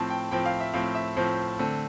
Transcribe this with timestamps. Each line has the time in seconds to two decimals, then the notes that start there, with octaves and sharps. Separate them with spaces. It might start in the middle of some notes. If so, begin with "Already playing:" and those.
Already playing: A2 F3 C4 A5
0.10 G5
0.31 A2 F3 C4 G5
0.46 F5
0.60 E5
0.74 A2 F3 C4 F5
0.95 E5
1.16 A2 F3 C4 C5
1.59 D3 A3 C4